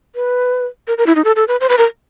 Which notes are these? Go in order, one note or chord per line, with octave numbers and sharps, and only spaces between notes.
B4
A#4
A#4
E4
D#4
A4
A4
B4
C5
B4
A#4